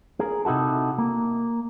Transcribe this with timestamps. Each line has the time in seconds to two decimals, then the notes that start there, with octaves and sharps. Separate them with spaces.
0.20 G#4 A#4
0.45 C3 D#4 E4 F#4 A4
0.98 A#3